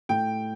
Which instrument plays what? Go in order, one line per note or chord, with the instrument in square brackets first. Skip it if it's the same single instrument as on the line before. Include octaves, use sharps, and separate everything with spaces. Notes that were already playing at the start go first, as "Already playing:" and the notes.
[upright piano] A2 G5